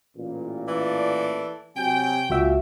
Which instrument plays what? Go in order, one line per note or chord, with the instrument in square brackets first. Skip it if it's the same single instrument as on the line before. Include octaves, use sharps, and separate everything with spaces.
[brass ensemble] A1 A#2
[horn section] E3 A4 D5
[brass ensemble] C3 F#3 G#5 [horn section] G5
[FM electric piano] C#2 F#4 E5 [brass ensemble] A#2